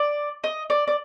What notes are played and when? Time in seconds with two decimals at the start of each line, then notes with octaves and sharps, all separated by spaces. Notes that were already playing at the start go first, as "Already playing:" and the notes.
Already playing: D5
0.44 D#5
0.70 D5
0.88 D5